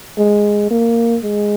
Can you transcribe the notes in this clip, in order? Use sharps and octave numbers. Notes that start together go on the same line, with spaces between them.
G#3
A#3
G#3